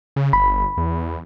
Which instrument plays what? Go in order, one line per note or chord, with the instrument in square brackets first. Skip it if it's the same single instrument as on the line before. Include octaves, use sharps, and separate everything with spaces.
[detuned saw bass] C#3
[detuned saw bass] G1 [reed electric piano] B5
[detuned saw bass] E2